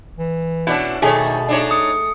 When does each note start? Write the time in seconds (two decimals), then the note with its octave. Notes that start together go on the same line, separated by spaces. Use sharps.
0.18 E3
0.67 B2 C#4 D4 E4
1.02 B2 D#3 A3 G#4 C#5
1.49 D4 D#4 C#5
1.71 D#6 C#7